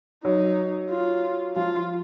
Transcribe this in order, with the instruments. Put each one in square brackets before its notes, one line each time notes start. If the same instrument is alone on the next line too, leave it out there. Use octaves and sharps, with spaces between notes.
[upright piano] F#3 [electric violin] D#4
[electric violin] F4
[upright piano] F3 [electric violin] F4